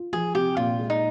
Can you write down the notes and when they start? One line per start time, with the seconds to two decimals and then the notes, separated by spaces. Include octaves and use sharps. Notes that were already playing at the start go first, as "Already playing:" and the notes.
Already playing: F4
0.13 F3 G#4
0.35 C3 G4
0.56 A#2 F4
0.79 G#3
0.90 D#4